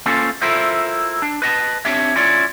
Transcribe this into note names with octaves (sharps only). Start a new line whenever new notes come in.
A#3 C#4 F4 A4 C5
E4 F4 A4 A#4 C5 E5
D4
B4 D#5 A5
C4 D4 G4 C#5 E5
C#4 E4 F4 C#5 D5